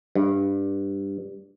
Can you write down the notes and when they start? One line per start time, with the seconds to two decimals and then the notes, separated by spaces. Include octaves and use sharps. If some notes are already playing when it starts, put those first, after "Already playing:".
0.15 G2